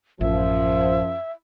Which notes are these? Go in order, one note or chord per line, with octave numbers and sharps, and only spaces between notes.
A1 F#2 F3 E5